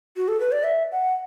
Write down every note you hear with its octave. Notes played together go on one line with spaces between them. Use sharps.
F#4
A4
B4
D5
E5
F#5